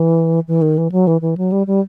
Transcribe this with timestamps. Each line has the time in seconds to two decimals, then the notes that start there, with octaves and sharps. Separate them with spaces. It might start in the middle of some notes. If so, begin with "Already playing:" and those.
Already playing: E3
0.48 E3
0.62 D#3
0.78 E3
0.92 F#3
1.07 E3
1.21 E3
1.37 F#3
1.52 G3
1.67 G3